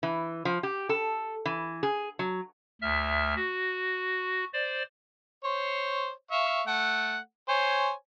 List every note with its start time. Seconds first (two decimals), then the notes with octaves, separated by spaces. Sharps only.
0.03 E3
0.45 F3
0.63 G4
0.89 A4
1.45 E3
1.83 G#4
2.19 F#3
2.82 D2 E5 F6
3.36 F#4
4.53 C5 D5
5.44 C5 C#5
6.31 E5 F5 C#6
6.67 A3 F#5
7.49 C5 C#5 G#5